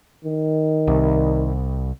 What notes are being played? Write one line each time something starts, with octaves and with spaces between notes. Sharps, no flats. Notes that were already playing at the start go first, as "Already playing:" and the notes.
D#3
C2